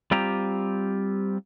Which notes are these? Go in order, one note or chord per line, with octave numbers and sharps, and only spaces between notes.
G3 C4 F4 G4 A#5